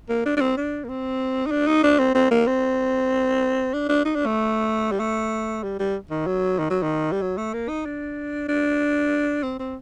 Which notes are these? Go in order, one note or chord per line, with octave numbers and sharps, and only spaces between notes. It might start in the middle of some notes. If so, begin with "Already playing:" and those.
A#3
D4
D4
C4
D4
A#3
C4
D#4
D4
D#4
D4
C4
C4
A#3
C4
D4
D4
D#4
D4
A3
G3
A3
G3
G3
D#3
F#3
D#3
F#3
D#3
G3
F#3
A3
A#3
D#4
D4
D4
C4
C4